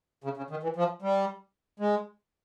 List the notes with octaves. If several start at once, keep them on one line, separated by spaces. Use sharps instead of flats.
C#3
C#3
D#3
E3
F3
G3
G#3